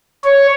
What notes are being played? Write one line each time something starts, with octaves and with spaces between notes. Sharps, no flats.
C#5